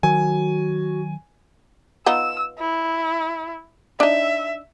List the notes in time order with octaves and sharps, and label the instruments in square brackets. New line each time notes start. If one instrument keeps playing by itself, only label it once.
[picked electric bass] D#3 F#3 [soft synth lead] F#4 [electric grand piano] G#5
[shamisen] B3 D#4 F4 [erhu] E6
[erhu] E4
[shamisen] D4 D#4 [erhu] E5